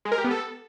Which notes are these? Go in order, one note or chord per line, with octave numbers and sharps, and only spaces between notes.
G#3
A#4
G4
B3
A4